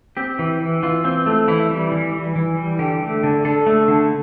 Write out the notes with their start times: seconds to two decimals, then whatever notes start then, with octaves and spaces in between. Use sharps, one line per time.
0.17 C4 G4
0.39 E3
0.60 E3
0.83 E3 F4
1.05 C4
1.26 A3
1.48 E3 E4
1.70 G3
1.92 E3
2.14 E3
2.36 E3
2.57 G3
2.79 D3 G4
3.01 A3
3.23 D3
3.45 D3 A4
3.67 A3
3.88 D3